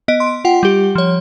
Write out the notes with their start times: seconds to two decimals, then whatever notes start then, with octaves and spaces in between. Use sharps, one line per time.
0.08 B3 D#5 D7
0.20 C6
0.45 F4 F#5 G5
0.63 G3 G4
0.95 F3 C#5